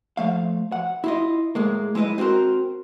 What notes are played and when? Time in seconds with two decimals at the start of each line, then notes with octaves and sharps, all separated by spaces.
0.17 F3 A3 F5
0.72 F#5
1.04 E4 F4 D#5
1.55 A2 G#3 A#3
1.95 G#3 E4 B4 D#5
2.18 C4 F#4 A4 A#4 C5